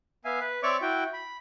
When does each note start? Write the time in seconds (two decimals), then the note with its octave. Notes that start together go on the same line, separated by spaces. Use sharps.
0.25 B3 E5 F5 G#5
0.40 B4
0.63 C4 C#5 D5 E5 C#6 D6
0.82 E4 F#4 G5
1.13 B5